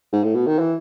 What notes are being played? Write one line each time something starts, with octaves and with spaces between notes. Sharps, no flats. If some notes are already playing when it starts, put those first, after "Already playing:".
G#2
A2
B2
D#3
E3